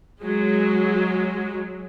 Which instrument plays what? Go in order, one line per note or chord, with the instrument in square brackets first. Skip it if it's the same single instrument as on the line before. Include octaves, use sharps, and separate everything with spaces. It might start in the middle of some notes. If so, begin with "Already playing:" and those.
[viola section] F#3 G#3